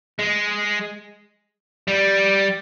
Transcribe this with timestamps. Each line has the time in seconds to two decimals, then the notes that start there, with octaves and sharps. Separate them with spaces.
0.19 G#3
1.88 G3